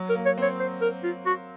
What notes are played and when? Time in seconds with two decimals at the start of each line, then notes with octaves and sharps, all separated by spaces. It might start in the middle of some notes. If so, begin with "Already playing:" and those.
Already playing: F#3
0.09 A#4
0.15 A#3
0.26 C#5
0.38 C4 C#5
0.60 C5
0.81 A#4
1.04 F4
1.26 F#4